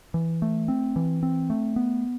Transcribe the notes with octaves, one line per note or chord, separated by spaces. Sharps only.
E3
A3
C4
E3
C4
A3
B3